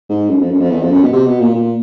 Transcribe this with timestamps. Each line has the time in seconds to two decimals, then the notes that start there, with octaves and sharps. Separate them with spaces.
0.10 G#2
0.30 F#2
0.41 F2
0.51 F#2
0.61 F2
0.71 E2
0.82 F2
0.92 F#2
1.03 B2
1.13 C3
1.26 B2
1.41 A#2
1.55 A#2